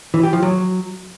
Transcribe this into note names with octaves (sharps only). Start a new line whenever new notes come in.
E3
G4
F3
F#3